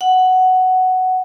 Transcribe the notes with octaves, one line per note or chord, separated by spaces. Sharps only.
F#5